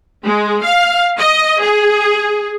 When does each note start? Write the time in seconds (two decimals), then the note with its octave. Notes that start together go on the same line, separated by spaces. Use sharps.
0.23 G#3
0.62 F5
1.18 D#5
1.61 G#4